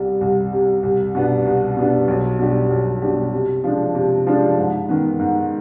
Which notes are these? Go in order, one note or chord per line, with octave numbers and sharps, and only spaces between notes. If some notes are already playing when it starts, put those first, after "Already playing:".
Already playing: C2 C3 G3
C2
C3 G3
C2
B2 G3 B3 D4
C2
B2 G3 B3 D4
B1
B2 G3 D4 G4
B1
B2 G3 D4 G4
C3
F3 G#3 D4
C3
F3 G#3 D4
G#2
D#3 B3
G#2